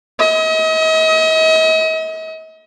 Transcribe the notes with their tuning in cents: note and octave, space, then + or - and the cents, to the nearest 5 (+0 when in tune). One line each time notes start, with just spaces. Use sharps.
D#5 +40